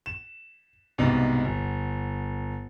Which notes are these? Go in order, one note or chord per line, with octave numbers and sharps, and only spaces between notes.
E7
C2 G#2 B2 D5
G1